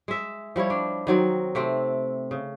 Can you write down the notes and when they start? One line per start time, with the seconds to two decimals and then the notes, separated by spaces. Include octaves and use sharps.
0.08 G#3 E5
0.56 F3 G3 E4 C#5
0.70 D4
1.07 D#3 F#3 C4
1.55 C3 A3 C4
2.31 C#3